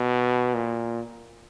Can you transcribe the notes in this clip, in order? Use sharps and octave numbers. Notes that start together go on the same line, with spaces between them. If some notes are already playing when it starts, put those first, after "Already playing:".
Already playing: B2
A#2